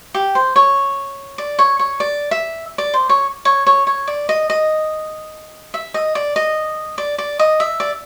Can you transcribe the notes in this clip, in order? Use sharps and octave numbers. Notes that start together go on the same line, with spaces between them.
G4
C5
C#5
D5
C#5
C#5
D5
E5
D5
C5
C#5
C#5
C#5
C#5
D5
D#5
D#5
E5
D#5
D5
D#5
D5
D5
D#5
E5
D5